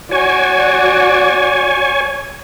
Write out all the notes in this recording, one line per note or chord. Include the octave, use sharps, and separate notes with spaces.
F#4 C#5 D5 G#5